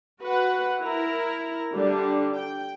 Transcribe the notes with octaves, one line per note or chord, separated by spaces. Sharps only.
F#4 B4 F#5
E4 A#4 A#5
D3 G3 D4
G5